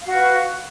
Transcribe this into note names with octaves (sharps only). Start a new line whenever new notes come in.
F#4 B4 F5